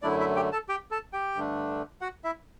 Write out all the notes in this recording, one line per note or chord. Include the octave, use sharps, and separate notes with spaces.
F#2 D3 F#3 A3 D4 E4 D5
E4 E5
G4 G5
A4 A5
G4 G5
A4 A5
G4 G5
G2 D3 A3 D4
F#4 F#5
E4 E5